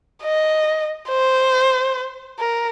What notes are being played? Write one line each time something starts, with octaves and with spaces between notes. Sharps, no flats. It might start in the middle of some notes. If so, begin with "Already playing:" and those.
D#5
C5
A#4